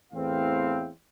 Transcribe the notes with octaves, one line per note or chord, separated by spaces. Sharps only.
E2 A2 C4 F5